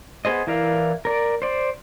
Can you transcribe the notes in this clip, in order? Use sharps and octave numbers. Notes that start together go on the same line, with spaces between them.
B3 G#4 C5 D#5
E3 E4 A#4 D5 F5
A#4 D5
C5 D5